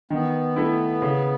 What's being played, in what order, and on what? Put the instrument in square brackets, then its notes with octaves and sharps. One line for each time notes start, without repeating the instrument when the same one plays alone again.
[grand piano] D#3 [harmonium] B3
[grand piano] A3 E4
C#3